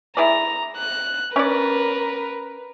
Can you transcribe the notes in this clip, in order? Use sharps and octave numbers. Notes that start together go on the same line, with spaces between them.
E4 G#4 D5 A#5
F#6
C#4 A#4 B4 D5